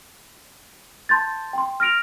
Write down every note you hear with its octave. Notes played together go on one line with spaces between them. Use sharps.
A5 C6 G6 A6
G5 C6
F6 A#6 D7 F7